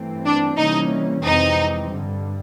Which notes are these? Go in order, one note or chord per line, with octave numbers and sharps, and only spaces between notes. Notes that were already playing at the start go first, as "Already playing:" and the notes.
Already playing: G2 E3 A3 C4
D4
C3 E3 G3 A#3 C#4 D#4
F2 C3 E3 G#3 C4 D#4
G2 D3 G3